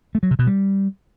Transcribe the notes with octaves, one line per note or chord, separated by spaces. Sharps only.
A3
F#3
C3
B2
G3